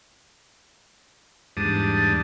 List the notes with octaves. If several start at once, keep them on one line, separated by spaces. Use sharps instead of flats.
E2 G#2 G3 D4 A5 D#6